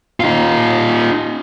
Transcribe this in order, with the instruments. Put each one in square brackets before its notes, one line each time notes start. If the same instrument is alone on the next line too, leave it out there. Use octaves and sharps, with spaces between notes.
[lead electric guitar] D#4 F4